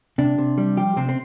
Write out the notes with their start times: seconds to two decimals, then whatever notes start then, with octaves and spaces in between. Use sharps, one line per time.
0.18 C3 D4
0.38 C3
0.58 G3
0.77 F3 G4
0.97 C3 C4
1.09 C4